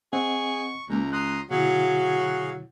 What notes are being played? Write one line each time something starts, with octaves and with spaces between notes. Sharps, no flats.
C4 G#4 D#5 F#5 C#6
C#2 G#3 A#3 A#5
A#5 C6 D#6 F#6
B2 D3 F#3 E4 F#4 G#4 F5